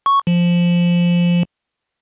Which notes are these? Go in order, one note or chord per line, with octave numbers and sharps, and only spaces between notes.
C#6
F3